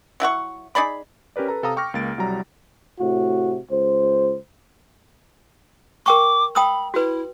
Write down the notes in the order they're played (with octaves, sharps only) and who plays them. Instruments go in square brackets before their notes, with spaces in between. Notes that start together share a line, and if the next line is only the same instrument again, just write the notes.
[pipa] F#3 E4 F#5 C#6
D#4 G#4 D5 B5
[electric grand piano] C#4 G4 A#4 B4 D5
A4 B4 A#5
C3 A4 F5 A#5 D#6
G5 C#6 D6 F6 A#6
C#2 A#3 A6 D7
C2 F#3 G3 A#5
[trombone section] A2 C3 F#4
C#2 C5
[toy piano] A#4 G5 C#6 [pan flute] D6
[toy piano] G5 D#6 E6 [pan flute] B5
[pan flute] E4 [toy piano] F#4 B4